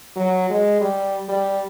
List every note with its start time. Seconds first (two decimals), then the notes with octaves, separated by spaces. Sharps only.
0.16 F#3
0.50 G#3
0.80 G3
1.29 G3